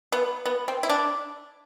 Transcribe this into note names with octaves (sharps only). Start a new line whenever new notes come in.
B3
B3
C4
E4
D4